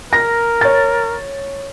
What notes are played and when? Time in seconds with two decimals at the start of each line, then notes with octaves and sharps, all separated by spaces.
0.13 A#4 A#6
0.61 C#5 A6